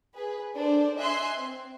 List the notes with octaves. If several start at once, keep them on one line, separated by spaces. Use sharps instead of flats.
G#4 B4
D4 A4 C5 D5
D#5 E5 G#5 C6 F#6
C4